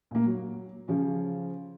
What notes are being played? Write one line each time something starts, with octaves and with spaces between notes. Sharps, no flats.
A#2 A#3
F#3
C#3 F3 C#4